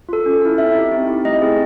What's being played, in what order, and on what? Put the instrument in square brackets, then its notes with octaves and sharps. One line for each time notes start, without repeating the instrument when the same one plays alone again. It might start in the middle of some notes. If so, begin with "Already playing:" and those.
[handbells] F4 A4
C#4
E4 A4
C4 E5
D#4 G4
C4
E4 G4
A3 D#5
C4 E4 G#4